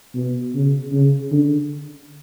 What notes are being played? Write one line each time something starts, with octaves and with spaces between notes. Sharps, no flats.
B2
C#3
C#3
D3